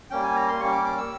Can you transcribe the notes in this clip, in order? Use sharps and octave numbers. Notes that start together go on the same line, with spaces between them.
G3 A#3 C#4 G5
G#5
A#5
C6
G3 A#3 C#4 C#6
D6
D6
E6